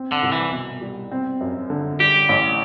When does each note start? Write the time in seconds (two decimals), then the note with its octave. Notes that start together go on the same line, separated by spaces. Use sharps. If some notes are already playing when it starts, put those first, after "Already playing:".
Already playing: C4
0.12 D3
0.22 C2
0.32 E3
0.52 B2
0.81 G3
1.11 C4
1.41 F#2
1.70 D3
1.99 G3 G4
2.29 A1